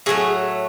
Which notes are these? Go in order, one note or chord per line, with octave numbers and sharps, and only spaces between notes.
A2 F#3 A3 G#4